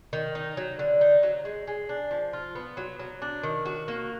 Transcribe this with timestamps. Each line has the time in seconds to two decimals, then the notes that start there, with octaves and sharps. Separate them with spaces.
0.13 D#3
0.35 D#4
0.57 F#3
0.79 D3
1.01 D#4
1.23 F#3
1.45 G#3
1.67 G#3
1.89 D4
2.11 F3
2.33 F4
2.55 B3
2.77 F#3
2.99 F#3
3.22 D4
3.43 D#3
3.66 F#4
3.88 A#3